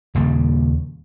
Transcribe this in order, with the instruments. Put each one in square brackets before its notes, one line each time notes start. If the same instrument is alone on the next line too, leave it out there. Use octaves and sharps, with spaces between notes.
[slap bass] D#2 A#2 C#3 G3